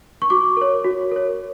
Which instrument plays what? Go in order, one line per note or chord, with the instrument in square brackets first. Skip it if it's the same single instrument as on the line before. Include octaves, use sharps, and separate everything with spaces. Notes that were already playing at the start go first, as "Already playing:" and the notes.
[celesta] C#6
F#4 D6
A#4 C#5
F#4
A#4 C#5